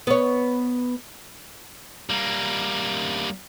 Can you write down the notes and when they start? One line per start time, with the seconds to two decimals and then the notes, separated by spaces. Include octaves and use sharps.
0.07 B3 C#5
2.10 G3 A#3